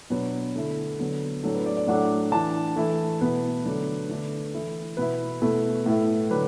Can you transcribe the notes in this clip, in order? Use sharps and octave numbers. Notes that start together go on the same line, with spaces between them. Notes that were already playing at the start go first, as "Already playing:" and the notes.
B2 F#3 D4 B4
D3 A3 E4 A4
D3 F#3 B3
A2 F#3 D4 A4
B4
D5
D5
A2 F#3 A3 D4 F#5
E3 D4 A5
E3 A3 E4
B2 B3 E4 B4
D3 F#3 A3 D4
D3 A3 D4 A4
E3 A3 E4
B2 B3 E4 B4
B2 A3 E4
A2 A3 E4
D3 F#3 D4 B4